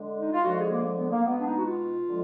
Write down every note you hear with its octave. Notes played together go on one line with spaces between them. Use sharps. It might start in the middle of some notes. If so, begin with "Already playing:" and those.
Already playing: D3 G#3
D#4
F4
D3 F3 G#3 F#4
G#4
A#3
G#3
B3
A#3
B2 G#3 B3
D4
D#4
F#4
F4
D3 F3 G#3